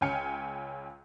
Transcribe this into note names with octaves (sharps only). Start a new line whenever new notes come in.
C#2 C#4 G5 G#5 F6 C#7